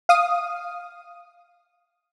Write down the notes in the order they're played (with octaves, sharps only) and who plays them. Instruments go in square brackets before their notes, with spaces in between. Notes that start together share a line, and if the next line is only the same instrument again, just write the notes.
[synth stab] F5 D#6